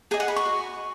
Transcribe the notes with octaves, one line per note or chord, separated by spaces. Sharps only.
G#4 D#5 G#5
F#5
B5
C#6
F#4